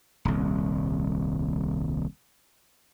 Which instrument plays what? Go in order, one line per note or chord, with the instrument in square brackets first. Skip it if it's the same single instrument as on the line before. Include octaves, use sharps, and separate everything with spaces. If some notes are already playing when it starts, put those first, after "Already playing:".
[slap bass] D#1 C2